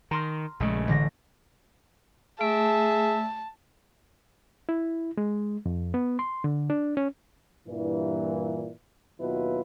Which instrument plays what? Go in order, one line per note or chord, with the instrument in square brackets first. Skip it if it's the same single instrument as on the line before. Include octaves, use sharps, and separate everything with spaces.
[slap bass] D#3 [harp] A#5 C6 F6
[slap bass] A#1 C#3 [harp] G#3 A3
[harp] A1 D3 A#6
[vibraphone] A3 [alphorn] G#4 [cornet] E5 [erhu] A5
[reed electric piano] E4
G#3
F2
B3
C6
D3
D4
C#4
[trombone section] G2 A#2 E3
D#2 B2 F#3 E4 F4 B4